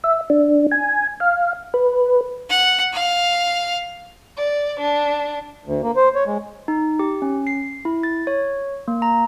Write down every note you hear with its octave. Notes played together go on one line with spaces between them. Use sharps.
E5
D4
G#5
F5
B4
F#5
F5
D5
D4
D2
A#3
C5
C#5
G#3
D#4
G4
C#4
C7
E4
A6
C#5
A#3
A#5